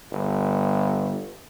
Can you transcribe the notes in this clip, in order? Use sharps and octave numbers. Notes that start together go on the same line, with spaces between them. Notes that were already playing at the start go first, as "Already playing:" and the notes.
G1